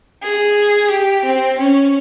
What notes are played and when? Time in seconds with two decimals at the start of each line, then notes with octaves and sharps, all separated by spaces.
0.23 G#4
0.91 G4
1.25 C4
1.58 C#4